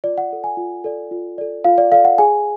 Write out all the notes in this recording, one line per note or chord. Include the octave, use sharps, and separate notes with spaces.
F4 D5
F#5
A4 D5
G#5
F4
A4 D5
F4
A4 D5
F4 F5
D5
A4 D5 F5
F#5
G#4 G#5